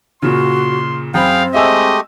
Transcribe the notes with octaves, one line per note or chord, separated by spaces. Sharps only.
A#2 C#3 F#4 C6
F#2 C4 G#4 F5 G5 B5
G#3 A3 G4 D#5 E5 G#5 E6